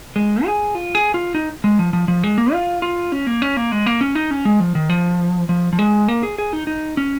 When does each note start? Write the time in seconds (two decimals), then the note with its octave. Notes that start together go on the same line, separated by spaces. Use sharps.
0.16 G#3
0.45 G#4
0.75 F4
0.95 G#4
1.14 F4
1.35 D#4
1.64 G#3
1.79 F3
1.93 F3
2.08 F3
2.24 G#3
2.38 A#3
2.53 F4
2.82 F4
3.12 C#4
3.27 A#3
3.42 C#4
3.57 A#3
3.72 G#3
3.86 A#3
4.01 C#4
4.15 D#4
4.31 C#4
4.45 G#3
4.60 F3
4.75 D#3
4.90 F3
5.49 F3
5.73 F3
5.79 G#3
6.08 A#3
6.23 G#4
6.38 G#4
6.53 D#4
6.67 D#4
6.97 C#4